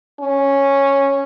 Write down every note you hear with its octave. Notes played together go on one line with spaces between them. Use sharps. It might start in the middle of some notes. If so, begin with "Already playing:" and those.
C#4